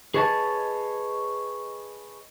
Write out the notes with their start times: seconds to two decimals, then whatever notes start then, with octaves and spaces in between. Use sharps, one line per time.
0.14 G#4 B4 C#5 D#5 E5 A5